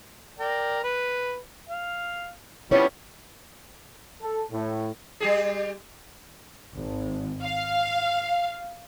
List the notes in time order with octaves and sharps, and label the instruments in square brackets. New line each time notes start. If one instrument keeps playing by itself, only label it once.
[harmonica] A#4 D5 G5
B4
F5
[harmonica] F3 G3 B3 [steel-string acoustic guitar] C#4 E4 C#5
[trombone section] A4
A2
[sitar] G3 G4 G#4
[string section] G#1
F5